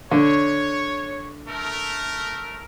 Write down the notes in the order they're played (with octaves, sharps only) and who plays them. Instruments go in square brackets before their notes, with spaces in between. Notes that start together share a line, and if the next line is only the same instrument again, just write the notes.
[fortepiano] D3 [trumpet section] C#5
[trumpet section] A3 A#4